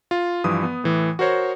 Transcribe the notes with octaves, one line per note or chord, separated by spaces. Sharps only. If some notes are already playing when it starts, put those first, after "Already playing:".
F4
G2 E3 F3 D#6
B3
A2 E3
F#4 A#4 C5 C#5